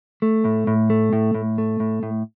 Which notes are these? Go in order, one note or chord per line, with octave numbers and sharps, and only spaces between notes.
A3
A2
A2
A3
A2
A2
A3
A2
A2